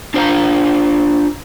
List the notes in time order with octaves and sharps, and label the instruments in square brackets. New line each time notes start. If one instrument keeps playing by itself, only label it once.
[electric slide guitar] D4 F4 C5 C#5 F5 A#5